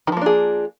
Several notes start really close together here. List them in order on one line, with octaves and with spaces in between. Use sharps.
D#3 F3 A#3 D4 G#4